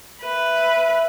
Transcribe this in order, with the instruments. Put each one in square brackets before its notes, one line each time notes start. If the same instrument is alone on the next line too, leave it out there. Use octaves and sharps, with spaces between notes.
[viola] B4 [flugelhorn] E5